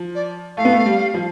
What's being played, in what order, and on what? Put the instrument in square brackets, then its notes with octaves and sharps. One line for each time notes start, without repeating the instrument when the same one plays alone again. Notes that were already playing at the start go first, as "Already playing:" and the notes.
Already playing: [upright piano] F3
[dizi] D5
[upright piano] A3 [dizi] F5
[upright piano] B3
A3
G3
F3